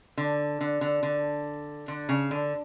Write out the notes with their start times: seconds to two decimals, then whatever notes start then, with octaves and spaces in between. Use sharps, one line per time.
0.17 D3
0.61 D3
0.81 D3
1.03 D3
1.88 D3
2.09 C#3
2.31 D3